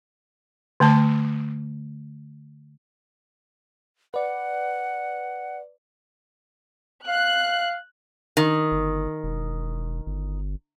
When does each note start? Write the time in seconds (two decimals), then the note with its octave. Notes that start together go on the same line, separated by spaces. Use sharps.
0.80 D3 A3 A5
4.14 B4 D5 F#5
7.08 F5 F#6
8.37 D#3
8.71 G1
9.23 E1
10.06 G1